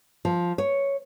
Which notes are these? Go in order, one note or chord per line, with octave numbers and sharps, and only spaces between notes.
F3
C#5